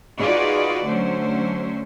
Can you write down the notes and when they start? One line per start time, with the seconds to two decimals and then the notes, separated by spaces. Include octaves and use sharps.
0.20 D#4 F4 F#4 G#4 B4 D5
0.85 D3 F#3 A3 C#4 C5